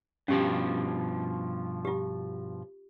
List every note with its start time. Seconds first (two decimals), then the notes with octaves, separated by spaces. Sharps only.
0.28 G2 B2 F3 C#4 G4
1.85 F4 G4